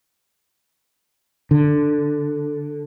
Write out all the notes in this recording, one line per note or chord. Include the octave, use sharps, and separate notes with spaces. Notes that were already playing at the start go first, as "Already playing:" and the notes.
D3